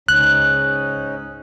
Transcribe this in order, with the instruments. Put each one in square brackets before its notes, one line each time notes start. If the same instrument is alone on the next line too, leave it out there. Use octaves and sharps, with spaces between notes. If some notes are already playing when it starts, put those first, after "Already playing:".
[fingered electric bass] C#2 [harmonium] G#2 C#4 D#4 [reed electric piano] F#6